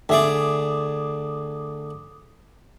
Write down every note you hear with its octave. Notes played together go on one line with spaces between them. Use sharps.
D2 G#4 D5 E5 D6 D#6